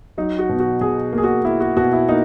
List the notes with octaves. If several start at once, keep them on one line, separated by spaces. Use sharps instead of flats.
F#3 D#4
F#4
B2
F#4
B2 G#4
A#3
G#4
F#4
A#3 E4
F#4
B2 F#4
E4
A#3 D#4